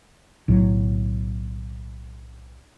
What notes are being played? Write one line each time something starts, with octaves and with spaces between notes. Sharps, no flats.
B1 A2 D3 F#3